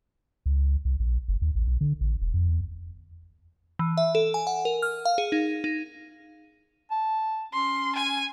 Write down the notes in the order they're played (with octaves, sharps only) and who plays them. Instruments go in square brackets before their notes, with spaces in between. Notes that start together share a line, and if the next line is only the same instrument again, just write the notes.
[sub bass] C#2
C2
A#1
F#1
D#2
A1
B1
D3
A1
E1
F2
E2
[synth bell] E3
E5
A4
G#5
F#5
A#4
F6
F5
G#4
D#4
D#4
[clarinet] A5
[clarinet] C#4 [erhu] C6
[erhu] G#5